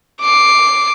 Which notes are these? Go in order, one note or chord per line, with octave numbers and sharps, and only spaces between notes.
D6 C7